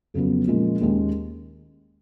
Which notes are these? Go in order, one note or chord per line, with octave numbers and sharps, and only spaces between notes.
F2 C#3 F#3 B3
A#2 F3 G#3 C#4
D#2 D#3 G#3 C#4